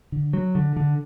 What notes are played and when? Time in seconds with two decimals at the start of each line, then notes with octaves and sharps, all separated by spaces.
0.12 D3
0.33 F#3
0.55 D3
0.77 D3